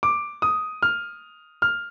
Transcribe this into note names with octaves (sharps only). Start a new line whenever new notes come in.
D6
D#6
F6
F6